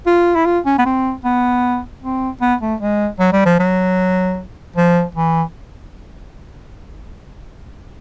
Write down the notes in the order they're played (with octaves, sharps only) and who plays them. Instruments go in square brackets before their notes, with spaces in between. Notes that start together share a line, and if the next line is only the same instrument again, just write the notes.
[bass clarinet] F4
E4
F4
C#4
B3
C4
B3
C4
B3
A3
G#3
F#3
G3
F3
F#3
F3
E3